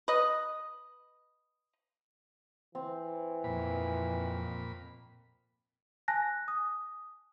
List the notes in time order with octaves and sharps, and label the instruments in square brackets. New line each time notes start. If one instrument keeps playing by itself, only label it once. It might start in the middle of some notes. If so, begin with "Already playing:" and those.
[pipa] B4 D#5
[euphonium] E3 [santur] C4
[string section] F2 [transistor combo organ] A#2 B5
[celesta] G#5 A5 F#6 A#6
D#6